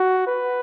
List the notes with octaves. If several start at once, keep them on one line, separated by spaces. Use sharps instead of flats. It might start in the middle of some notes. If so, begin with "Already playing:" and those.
Already playing: F#4
B4